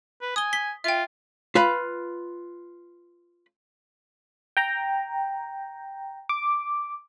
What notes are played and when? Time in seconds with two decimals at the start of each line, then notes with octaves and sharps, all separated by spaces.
0.22 B4
0.36 G#5 D#6 G7
0.53 B6 G7
0.84 F4 E5 G5
1.55 F4 B4 B5
4.57 G5 A#5
6.29 D6